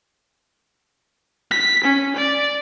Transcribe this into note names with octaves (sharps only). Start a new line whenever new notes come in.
B6
C#4
D5